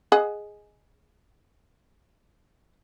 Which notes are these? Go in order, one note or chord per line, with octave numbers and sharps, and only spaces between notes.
G#4 D#5 F#5